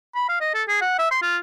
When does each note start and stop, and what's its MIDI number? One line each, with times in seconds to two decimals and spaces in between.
0.15 0.25 83
0.29 0.37 77
0.41 0.51 75
0.54 0.63 69
0.68 0.81 68
0.82 0.97 78
0.99 1.08 76
1.11 1.20 84
1.23 1.37 65